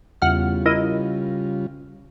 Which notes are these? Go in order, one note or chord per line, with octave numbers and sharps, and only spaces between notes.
E2 C#3 G3 F4 F#5 F6
E4 A#4 D#5